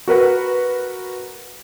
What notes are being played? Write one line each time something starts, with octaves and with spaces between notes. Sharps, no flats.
F#4 A#4 B4 F#5